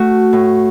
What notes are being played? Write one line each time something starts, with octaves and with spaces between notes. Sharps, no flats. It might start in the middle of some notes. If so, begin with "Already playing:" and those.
Already playing: A3 F#4
A2